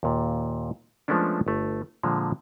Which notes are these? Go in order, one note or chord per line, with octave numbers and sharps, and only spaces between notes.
D#2 A#2
F3 G#3 A3 B3 C#4 D4
G1 A3
A#2 D3 F3 G#3